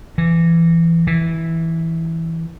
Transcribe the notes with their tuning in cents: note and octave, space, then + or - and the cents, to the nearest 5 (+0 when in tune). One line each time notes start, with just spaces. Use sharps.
E3 +20
E3 -10